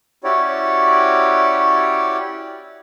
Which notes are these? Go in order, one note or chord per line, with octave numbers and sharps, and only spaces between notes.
C#4 E4 F#4 G4 C#5 D5